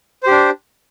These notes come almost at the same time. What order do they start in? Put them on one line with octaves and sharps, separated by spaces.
C5 G4 D4